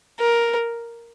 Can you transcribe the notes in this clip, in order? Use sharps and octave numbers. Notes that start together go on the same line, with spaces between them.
A#4